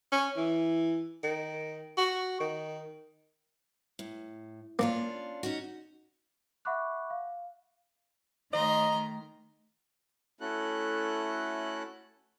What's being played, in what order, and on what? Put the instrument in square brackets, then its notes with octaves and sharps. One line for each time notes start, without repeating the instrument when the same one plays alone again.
[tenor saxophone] C#4
E3
D#3
F#4
D#3
[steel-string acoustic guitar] A2
[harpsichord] A#3 [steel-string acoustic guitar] C#4 D4 F4
[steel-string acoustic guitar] C#4 D#4 F#4
[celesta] E5 F#5 B5 C#6 D6 F#6
F5
[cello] D#3 A3 [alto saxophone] D#5 [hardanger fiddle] A#5 C6
[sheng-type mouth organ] A3 C#4 E4 F#4 A4 F#6